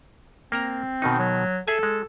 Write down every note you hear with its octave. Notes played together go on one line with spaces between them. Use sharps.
A#3 C4 A#4 A#5
B2 D#3 D#4
F#3
G#4 A4 E5 G#5
G#3